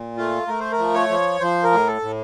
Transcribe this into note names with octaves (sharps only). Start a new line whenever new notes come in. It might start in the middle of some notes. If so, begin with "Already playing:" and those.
Already playing: A#2
A3 F4
A3 A#4
C5
A#4
F3
C#5
F3
F3 C5
A#4
A2
A4
A2